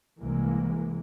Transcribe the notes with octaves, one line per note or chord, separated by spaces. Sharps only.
C2 C3 E3 G#3 A#3